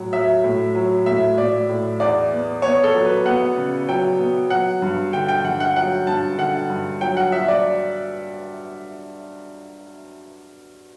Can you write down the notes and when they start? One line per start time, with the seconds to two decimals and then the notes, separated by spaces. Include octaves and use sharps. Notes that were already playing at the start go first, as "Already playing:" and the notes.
Already playing: A2 F#3
0.13 F#3 E5
0.44 A2
0.75 F#3
1.06 A2 E5
1.37 A2 D5
1.69 A2
2.00 E2 D5
2.32 B3
2.62 B3 C#5
2.84 A4
2.94 F#3
3.05 B4
3.26 B3 F#5
3.57 C#3
3.88 F#3 G5
4.19 B3
4.50 F#3 F#5
4.82 G2
5.13 D3 G5
5.28 G5
5.44 G2 F#5
5.60 F#5
5.76 F#3 F#5
6.07 G2 A5
6.38 D3 F#5
6.70 G2
7.01 F#3 G5
7.17 F#5
7.32 F#3 E5
7.48 D5